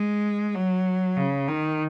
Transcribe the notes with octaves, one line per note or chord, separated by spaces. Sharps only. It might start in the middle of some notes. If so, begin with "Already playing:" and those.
Already playing: G#3
F#3
C#3
D#3